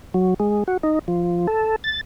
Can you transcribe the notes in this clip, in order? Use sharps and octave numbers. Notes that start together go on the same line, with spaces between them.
F#3
G#3
F#4
D#4
F3
A4
A6